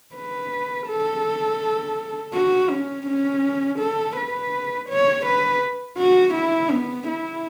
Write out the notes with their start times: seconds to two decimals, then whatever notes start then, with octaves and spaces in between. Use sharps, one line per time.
0.16 B4
0.88 A4
2.34 F#4
2.70 C#4
3.07 C#4
3.80 A4
4.16 B4
4.89 C#5
5.26 B4
5.98 F#4
6.35 E4
6.71 B3
7.07 E4